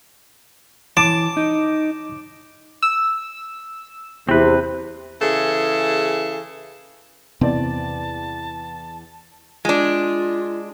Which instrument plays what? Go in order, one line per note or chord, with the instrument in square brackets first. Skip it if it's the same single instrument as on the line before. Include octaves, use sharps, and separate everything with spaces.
[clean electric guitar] E3 [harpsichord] A5 [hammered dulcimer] D6
[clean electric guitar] D#4
[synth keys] E6
[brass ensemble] E2 C3 [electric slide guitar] C4 B4
[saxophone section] C#3 E3 G#4 A4
[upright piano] E2 D5 [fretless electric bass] C3 B3 C4 [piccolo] A5
[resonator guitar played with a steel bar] G#3 D4 [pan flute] F4